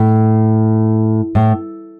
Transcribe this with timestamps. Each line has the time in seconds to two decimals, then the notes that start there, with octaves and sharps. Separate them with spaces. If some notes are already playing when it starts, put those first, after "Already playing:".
Already playing: A2
1.35 A2